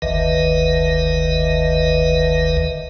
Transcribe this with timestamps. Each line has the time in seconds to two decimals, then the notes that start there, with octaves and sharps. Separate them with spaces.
0.02 F#1 D2 D#3 B4 D#5 E5